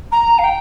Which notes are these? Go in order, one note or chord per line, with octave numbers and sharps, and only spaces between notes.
A#5
F5
G5